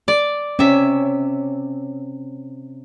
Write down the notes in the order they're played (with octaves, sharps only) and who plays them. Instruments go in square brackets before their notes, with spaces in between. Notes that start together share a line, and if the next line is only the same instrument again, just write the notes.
[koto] D5
[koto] C3 E5 [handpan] C#4